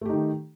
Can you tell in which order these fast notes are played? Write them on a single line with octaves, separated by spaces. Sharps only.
A3 G4 D#4 D#3